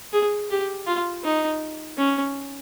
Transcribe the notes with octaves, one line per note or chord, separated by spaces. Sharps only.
G#4
G4
F4
D#4
C#4